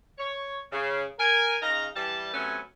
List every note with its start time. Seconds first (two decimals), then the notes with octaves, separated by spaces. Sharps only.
0.18 C#5
0.72 C#3
1.19 A#4 G#5
1.62 C#3 D#4 F5 A#5
1.96 E3 G3 A5
2.34 C3 F#3 A3 B3 C#4